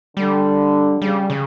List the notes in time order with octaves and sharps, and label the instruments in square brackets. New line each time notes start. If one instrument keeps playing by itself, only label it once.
[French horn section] D3 [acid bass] G3
[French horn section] C#3 [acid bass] G3
[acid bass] C#3